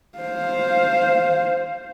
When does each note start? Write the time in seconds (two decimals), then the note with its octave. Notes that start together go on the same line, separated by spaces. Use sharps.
0.18 C5 F5